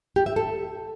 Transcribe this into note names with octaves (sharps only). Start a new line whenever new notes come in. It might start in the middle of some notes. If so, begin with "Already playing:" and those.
G4
E5
A4